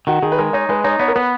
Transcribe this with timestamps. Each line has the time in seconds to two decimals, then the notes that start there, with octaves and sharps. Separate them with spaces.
0.07 D#3 F#4
0.22 D#3 G#4
0.32 B4
0.38 G#3 A#4
0.53 D#4 C#5
0.69 G#3 B4
0.84 D#4 C#5
0.99 B3 C#5
1.08 A#4
1.15 B3 B4